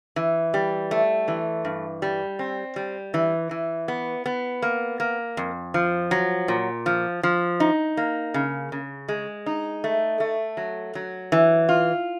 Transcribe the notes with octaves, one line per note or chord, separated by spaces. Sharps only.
E3
G3
A3
E3
G2
G3
C4
G3
E3
E3
B3
B3
A#3
A#3
F2
F3
F#3
A#2
F3
F3
D#4
A#3
C#3
C#3
G#3
D#4
A3
A3
F#3
F#3
E3
F4